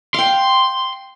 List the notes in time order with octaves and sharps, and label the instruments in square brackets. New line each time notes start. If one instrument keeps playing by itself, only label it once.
[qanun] F5 G5 [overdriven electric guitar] C6